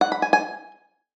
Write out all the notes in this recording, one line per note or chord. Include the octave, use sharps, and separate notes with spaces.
F#5
B5
G#5
G#5